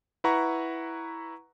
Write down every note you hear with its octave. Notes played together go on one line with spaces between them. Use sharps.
E4 B4 F#5 A#5 C#6